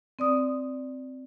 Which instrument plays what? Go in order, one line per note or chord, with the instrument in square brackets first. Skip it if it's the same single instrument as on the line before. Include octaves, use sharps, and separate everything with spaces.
[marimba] C4 D5 D#6